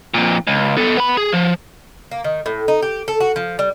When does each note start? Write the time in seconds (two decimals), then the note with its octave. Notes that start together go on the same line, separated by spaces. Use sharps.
0.14 F2 A#2
0.47 C#2
0.77 B3 A4
0.97 B3 B5
1.17 G#4
1.33 F3
2.11 A#3
2.24 D#3
2.46 A2
2.68 D#4
2.82 G4
3.08 A4
3.20 F#4
3.36 F3
3.59 G3